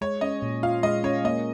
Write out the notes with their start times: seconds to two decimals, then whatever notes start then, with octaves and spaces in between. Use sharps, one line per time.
0.01 G#3 C#5
0.21 C#4 D#5
0.42 A#2
0.63 F4 F5
0.83 G#3 D#5
1.04 C#4 C#5
1.25 A#3 D#5